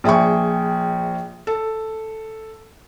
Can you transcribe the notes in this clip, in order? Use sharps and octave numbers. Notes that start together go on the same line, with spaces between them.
A#1 G#4 E5 G5 C#6
A4